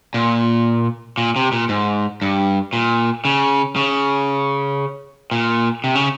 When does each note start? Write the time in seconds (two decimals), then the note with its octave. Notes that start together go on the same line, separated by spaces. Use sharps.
0.14 A#2
1.18 A#2
1.36 C3
1.52 A#2
1.69 G#2
2.22 G2
2.73 A#2
3.25 C#3
3.76 C#3
5.32 A#2
5.84 C3
5.95 C#3